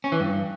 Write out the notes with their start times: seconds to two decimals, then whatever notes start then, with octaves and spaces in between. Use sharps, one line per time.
0.04 C#4
0.12 E3
0.20 G2